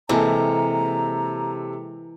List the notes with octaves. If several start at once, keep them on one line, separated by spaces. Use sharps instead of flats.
C3 E3 G#3 A#3 A4 A5 A#5